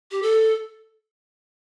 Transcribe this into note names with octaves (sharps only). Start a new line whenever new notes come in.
G4
A4